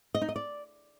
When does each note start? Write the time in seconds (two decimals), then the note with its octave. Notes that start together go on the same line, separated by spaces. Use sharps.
0.15 D#5
0.22 D#4
0.29 D#5
0.36 D5